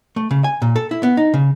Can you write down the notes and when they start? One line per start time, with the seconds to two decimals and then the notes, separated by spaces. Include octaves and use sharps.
0.16 A3
0.31 C#3
0.44 G#5
0.62 A#2
0.76 A4
0.91 E4
1.03 B3
1.17 D#4
1.34 C#3